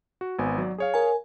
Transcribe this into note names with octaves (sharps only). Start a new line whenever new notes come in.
F#4
G#1 B3 G#5
F#3 D5
G#4 C#5 F5
A#4 G#5